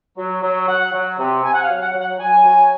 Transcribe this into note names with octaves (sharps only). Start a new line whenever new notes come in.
F#3
F#3
F#3 F#5
F#3
C3
C3 G#5
F#5
F5
F#3
F#5
F#3
F#5
F#3 G#5
F#3